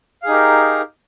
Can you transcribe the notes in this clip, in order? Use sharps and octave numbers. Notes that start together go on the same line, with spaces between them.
D#4 G4 G#4 A#4 F5